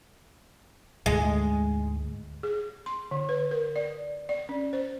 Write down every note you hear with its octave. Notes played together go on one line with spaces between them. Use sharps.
D2 G#2 G#3
G#4
C6
D3
B4
A#4
D5
D5
C#4
C5